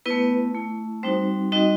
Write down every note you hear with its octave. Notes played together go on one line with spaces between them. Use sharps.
A3 B3 E4 B4
A3 E4
G3 C4 D#4 F#4 C5
G3 C4 D#4 F#4 D#5